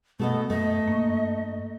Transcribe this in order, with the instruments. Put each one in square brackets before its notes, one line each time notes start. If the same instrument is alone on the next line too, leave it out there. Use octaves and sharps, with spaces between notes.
[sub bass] B2 [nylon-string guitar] A3 A4 D#5 [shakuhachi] B3
[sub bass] F#2 [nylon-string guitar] A3 [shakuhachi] D#5
[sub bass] G2 [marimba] A#3 C#6